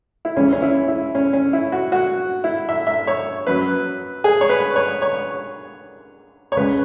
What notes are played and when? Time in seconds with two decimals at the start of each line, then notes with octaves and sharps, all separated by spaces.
0.25 E4
0.36 C#2 C#3 E3 C#4
0.52 C#4
0.62 E4
0.88 E4
1.15 C#4
1.33 C#4
1.53 E4
1.72 F#4
1.92 F#4
2.44 E4
2.69 E5
2.87 E5
3.07 C#5
3.47 F#2 F#3 B4
4.24 G#4
4.41 C#5
4.49 B4
4.76 C#5
5.02 C#5
6.52 C#5
6.56 C#2 C#3 G#3 B4